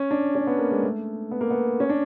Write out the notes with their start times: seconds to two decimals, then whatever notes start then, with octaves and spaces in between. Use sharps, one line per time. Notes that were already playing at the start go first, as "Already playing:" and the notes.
Already playing: C#4
0.11 D4
0.35 C#4
0.47 B3
0.59 A#3
0.71 G#3
0.83 A3
1.31 B3
1.41 A#3
1.50 B3
1.80 C#4
1.89 D4